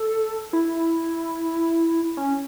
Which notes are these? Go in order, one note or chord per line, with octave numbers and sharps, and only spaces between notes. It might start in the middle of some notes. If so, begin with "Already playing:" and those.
Already playing: A4
E4
C#4